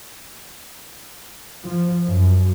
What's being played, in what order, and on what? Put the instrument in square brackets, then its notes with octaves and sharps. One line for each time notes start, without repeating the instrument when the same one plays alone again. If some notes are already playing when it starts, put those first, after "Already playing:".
[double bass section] F3
F#2